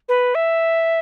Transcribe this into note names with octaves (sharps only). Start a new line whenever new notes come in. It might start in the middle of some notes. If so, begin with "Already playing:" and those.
B4
E5